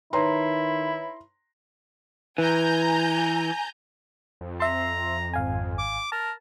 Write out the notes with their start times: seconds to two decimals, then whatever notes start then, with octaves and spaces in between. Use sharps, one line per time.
0.13 D#3 D#4 E4 B4 C#5 A#5 C6
2.38 E3 G#5 A#5 G6
4.41 F2
4.60 E5 A#5 C6
5.34 G#1 F5 G#5
5.78 D6
6.12 A#4 A5